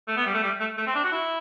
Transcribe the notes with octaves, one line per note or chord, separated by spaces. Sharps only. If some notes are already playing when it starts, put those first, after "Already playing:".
A3
B3
G3
A3
G3
A3
A3
C4
D4
F#4
E4